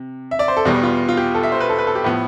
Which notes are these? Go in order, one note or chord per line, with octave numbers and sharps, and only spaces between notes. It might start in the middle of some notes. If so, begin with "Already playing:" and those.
Already playing: C3
E5
D5
C5
A4
E2 B2 G3 G4
F4
F4
G4
A4
E5
C5
B4
A4
B4
A4
G4
A2 F3 B3